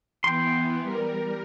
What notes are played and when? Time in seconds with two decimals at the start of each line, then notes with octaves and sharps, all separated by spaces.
0.24 E3 B3 G5 C6
0.83 G3 A#4